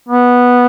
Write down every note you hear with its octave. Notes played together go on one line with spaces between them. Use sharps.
B3